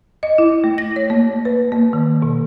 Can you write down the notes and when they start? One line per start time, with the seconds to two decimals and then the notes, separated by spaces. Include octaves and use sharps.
0.23 D#5
0.38 E4
0.64 A3
0.78 A#6
0.96 C#5
1.10 A#3
1.45 B4
1.72 A#3
1.93 D#3
2.22 B2